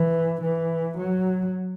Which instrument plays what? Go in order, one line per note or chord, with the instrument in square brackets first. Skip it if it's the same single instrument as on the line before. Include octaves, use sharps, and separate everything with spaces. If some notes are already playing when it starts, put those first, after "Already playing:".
Already playing: [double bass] E3
E3
F#3